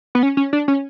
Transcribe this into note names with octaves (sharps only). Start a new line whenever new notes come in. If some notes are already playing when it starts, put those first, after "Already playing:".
B3
C#4
C#4
D4
C#4